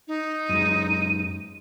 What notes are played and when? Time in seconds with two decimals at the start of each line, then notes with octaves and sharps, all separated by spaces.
0.08 D#4
0.49 F#2 G#3 D#7